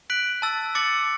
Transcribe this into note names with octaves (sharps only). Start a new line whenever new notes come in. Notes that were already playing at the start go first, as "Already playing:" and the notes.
F#6 B6 D7 F#7
A5 E6 A6
D6 A6 C#7 F#7